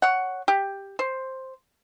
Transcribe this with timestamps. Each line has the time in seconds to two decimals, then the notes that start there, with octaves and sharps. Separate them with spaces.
0.02 C#5 F#5
0.48 G4
0.99 C5